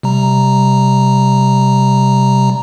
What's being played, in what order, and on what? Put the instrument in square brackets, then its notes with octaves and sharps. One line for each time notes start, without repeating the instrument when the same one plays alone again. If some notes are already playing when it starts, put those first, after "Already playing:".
[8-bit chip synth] C3 G3 A#5